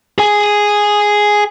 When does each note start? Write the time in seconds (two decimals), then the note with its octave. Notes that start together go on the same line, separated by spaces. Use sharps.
0.18 G#4 G#5